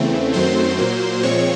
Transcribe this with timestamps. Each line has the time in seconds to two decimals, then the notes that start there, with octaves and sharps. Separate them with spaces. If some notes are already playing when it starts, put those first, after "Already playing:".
Already playing: E2 C#3 E3 A3 C4
0.33 F#2 D#3 F#3 A3 C4 C5 C6
0.78 A#2 F#3 A#3
1.23 A#2 F3 G#3 C4 C#5 C#6